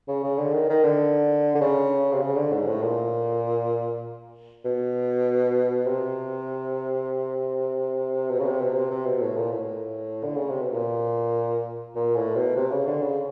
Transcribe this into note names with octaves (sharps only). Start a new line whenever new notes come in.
C#3
C#3
D3
D#3
D#3
D3
D3
C#3
C3
C#3
D3
G#2
A2
A#2
B2
C3
B2
C#3
C3
B2
C3
C3
B2
A2
A#2
A2
D3
C#3
C3
B2
A#2
A#2
A2
B2
C3
C#3
D3
C#3